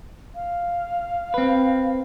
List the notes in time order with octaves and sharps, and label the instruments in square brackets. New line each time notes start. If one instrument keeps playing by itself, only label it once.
[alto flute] F5
[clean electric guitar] C4 B4